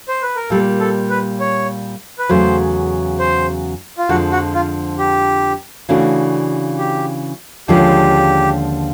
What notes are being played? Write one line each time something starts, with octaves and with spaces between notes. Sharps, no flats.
C5
B4
A#4
A#2 G3 A#3 A4
A4
B4
C#5
B4
E2 C#3 F#3 A3 C5
C5
F4
F2 D3 F3 G#3 F#4
F#4
F4
G4
C#3 E3 A3 D4 F#4
G4
D#2 D3 F3 G#3 C#4 G4